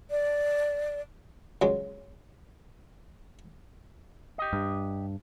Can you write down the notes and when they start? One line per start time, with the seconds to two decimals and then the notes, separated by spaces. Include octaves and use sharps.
0.11 D5
1.62 C#2 F#3 G#3
4.38 G4 D#5
4.53 G2